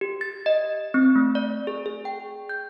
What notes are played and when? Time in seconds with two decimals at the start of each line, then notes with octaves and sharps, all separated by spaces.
0.01 G4
0.21 A6
0.46 D#5
0.94 C4
1.16 A3
1.35 D5
1.67 G#4
1.86 G#4
2.05 G5
2.49 G6